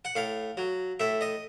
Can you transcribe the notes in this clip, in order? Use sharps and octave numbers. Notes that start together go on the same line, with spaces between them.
F#5
A2 F5
F#3
A2 E5
D#5